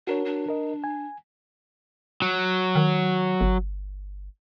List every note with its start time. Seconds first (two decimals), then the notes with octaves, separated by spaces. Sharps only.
0.07 D4 F#4 A#4 C#5
0.25 D4
0.49 A#4 D#5
0.84 G#5
2.22 F#3
2.75 D#3
3.41 G1